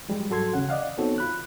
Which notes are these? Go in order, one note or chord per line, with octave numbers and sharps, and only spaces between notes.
F3 G3 G#3 G4
G#2 F#3 F#4 A4 C6 G#6
D2 C#3 C#4 F#5
D5 D#5 F5 F#5
B3 C4 D#4 F#4 A4 C#5
F4 B5 F#6